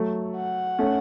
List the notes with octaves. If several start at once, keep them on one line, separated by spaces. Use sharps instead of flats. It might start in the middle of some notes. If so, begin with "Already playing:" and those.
Already playing: F#3 A3
F#5
A3 C#4